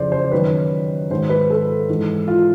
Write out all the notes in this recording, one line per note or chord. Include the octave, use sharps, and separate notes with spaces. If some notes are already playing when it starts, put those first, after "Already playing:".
Already playing: F2 C#3 E3 C5 D5
C5
F#2 D#3 B4
G#2 D#3 C5
B4
A4
G#2 E3
F4